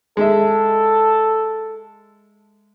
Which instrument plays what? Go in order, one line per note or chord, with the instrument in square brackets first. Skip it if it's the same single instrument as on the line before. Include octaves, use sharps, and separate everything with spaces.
[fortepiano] G#3 E5 [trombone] A4